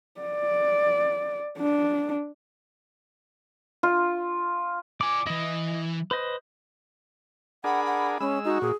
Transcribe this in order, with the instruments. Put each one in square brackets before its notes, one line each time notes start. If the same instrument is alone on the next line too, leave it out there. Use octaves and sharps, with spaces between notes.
[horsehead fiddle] D5
D4
[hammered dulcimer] F4
[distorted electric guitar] D5 G#5 [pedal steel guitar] D6
[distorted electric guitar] E3 E4 [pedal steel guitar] D#5
[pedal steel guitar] B4 C5 D#5
[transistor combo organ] D4 G#4 A#4 [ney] F#5 [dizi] B5
[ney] F#5
[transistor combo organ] G#3 E6 [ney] C#4
[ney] D#4 [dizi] F#4
[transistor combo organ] A#2 [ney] G#4